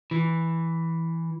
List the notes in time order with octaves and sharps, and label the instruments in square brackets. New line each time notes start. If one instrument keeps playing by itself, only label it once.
[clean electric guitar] E3